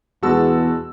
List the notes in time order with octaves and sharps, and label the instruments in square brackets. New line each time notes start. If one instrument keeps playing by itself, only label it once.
[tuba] E2 [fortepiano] B2 G#3 B3 [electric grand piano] F#4 A5 E6